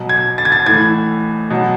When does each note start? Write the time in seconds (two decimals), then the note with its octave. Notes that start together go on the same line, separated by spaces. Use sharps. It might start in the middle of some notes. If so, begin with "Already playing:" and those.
Already playing: B2 F#3
0.09 G#6
0.38 A6
0.45 G#6
0.52 A6
0.66 A2 E3 G#6
1.50 B2 F#3